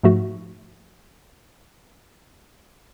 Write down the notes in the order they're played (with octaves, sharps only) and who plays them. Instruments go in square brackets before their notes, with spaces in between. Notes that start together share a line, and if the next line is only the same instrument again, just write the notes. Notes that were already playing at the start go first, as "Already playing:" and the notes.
[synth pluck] G#2 F3 A3 F#4